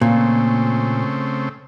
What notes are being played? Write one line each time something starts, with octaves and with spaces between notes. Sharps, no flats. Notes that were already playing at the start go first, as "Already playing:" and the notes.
A#2 C#3 A3 C4